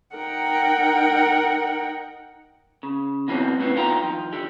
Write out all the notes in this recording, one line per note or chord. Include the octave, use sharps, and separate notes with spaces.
D#4 A#4 F#5 G5
C#3
B2 E3 F#3 C4
A2 C#3 E3 B3 C4
E2 D3 D#4 F4 G5 A#5
D#3 F3
D3 G4